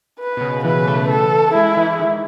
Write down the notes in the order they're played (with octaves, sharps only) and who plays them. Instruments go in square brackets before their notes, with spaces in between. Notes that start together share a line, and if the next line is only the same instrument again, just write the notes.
[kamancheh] B4
[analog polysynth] B2
C#3
[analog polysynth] E3 [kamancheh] B4
[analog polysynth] A3
[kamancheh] A4
[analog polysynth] G#3 [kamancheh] E4
[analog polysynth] E3
D#3